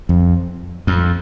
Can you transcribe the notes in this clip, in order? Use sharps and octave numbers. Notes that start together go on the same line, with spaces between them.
F2
F2